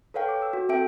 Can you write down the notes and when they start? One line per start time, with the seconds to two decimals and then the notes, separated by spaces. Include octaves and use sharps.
0.14 A4 B4 C#5 F5 G5
0.29 D6
0.42 E6
0.53 F#4
0.69 C4 A4 E5 G5 D7